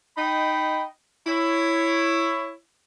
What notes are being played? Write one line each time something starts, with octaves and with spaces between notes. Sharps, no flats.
D#4 D#5 G5 B5
E4 C#5